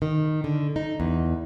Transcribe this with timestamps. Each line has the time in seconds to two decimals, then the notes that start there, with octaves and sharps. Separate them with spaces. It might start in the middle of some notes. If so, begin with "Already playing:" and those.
0.02 D#3
0.44 D3
0.76 D#4
1.00 E2